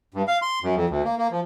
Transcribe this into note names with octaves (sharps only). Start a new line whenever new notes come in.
G2
F5
C6
F#2
F2
D2
A#3
A#3
F3